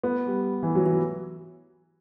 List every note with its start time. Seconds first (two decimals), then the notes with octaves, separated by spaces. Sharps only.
0.03 B3
0.27 G3
0.63 E3
0.75 F#3
0.86 E3